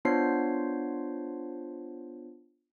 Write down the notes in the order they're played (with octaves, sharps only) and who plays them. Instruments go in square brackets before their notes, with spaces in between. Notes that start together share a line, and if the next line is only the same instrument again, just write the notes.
[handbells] B3 D4 F4 C5 C#5 C7